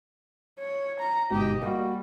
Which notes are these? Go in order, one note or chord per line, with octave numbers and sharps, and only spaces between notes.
C#5
A#5
G1 G#2 B2 G4 D#5
G3 A#3 F#4